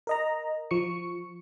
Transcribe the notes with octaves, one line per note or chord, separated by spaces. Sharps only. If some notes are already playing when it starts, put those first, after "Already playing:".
A#4 D#5 A#5
F3 C#6 C#7